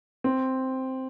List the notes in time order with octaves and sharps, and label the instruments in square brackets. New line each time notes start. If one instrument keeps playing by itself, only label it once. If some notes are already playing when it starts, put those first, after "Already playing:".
[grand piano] C4